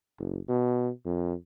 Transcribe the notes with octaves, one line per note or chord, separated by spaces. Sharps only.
F#1
B2
F2